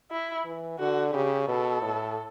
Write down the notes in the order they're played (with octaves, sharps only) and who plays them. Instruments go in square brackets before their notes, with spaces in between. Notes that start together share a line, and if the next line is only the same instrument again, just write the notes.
[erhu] E4
[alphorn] E3
[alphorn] D3 [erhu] F#4
[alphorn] C#3 [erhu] G4
[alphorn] B2 [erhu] A4
[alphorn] A2